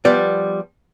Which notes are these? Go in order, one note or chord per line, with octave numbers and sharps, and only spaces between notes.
F3 G3 B3 D5